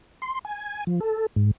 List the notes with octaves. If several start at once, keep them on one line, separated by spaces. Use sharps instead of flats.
C6
G#5
F3
A4
G#2